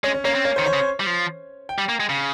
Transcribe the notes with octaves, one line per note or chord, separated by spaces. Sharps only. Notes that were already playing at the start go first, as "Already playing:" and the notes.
G#3 C#4
C#4
A#3 C#4
C4
A#3 C#4
D#3 C5
C#5
C#3
G3
F3
G5
G3
A#3
G#3
C#3